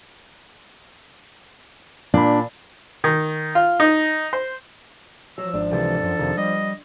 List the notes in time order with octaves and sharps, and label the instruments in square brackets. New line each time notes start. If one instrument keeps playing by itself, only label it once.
[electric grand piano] A#2 B5 [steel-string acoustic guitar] D4
[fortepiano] D#3
F4
D#4
C5
[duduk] F3 [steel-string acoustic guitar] F#3 [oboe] E6
[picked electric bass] G#1 [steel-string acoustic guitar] D4
[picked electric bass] C#2 C3 E3 [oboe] A4
[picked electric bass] A1 F#2
F2 C3 D#3
[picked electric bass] G3 [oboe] D#5